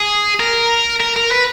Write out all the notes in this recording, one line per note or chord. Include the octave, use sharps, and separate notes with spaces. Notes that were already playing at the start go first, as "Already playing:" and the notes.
Already playing: G#4
A#4
A#4
A#4
B4